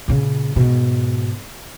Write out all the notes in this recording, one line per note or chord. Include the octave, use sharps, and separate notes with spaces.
A#2 C#3
G#2 B2